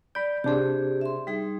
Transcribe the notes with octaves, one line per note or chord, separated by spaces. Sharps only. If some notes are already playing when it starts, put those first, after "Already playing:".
D5 B5 G6
C3 D4 G4 G#4 C5
E5 C6
G3 D#4 G#4